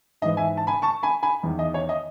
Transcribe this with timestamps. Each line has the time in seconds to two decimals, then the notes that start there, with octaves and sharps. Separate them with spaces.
0.22 G#2 D#5
0.25 E3
0.37 E5 G#5
0.57 A5
0.67 G#5 B5
0.82 A5 C#6
1.03 G#5 B5
1.23 G#5 B5
1.43 E2 D#3
1.59 D#5
1.74 C#5
1.89 D#5